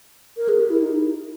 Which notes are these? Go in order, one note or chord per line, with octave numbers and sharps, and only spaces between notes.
A#4
G#4
G4
E4
D#4